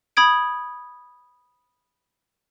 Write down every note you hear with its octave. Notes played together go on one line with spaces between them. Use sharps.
B5 D#6 G#6 D7